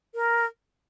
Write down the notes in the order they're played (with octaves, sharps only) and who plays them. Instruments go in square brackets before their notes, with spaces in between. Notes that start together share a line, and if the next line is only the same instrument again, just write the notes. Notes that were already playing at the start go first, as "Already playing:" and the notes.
[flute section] A#4